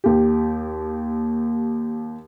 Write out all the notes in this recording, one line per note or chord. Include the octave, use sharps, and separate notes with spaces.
D#2 G4